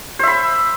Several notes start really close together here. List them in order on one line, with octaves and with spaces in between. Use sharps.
C5 E5 B5